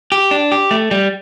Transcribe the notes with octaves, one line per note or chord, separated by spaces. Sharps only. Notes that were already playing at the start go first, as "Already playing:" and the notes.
G4
D4
G4
A3
G3